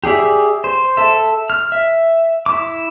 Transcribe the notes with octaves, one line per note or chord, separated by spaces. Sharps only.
G4 G#4 D5 E5
C5
A4 E5
F6
E5
E4 D6